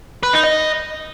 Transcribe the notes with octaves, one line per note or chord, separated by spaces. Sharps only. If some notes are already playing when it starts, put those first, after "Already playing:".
B4
D#4
D#5